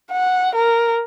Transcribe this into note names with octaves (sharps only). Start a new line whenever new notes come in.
F#5
A#4